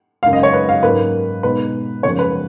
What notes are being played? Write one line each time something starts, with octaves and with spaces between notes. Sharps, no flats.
F#2 C#3 G#3 F5
D#5
C#5
B4
F5
G#2 F#3 A#3 C#4 B4
B2 G#3 D#4 B4
F#2 C#3 F3 G#3 C#5
B4